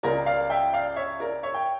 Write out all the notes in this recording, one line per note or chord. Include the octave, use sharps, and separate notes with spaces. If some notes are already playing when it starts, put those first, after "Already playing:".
C#2 C#3 G3 A#4 D5
D5 F5
E5 G5
D5 F5
C#5 E5
A#4 D5
C#5 E5
G5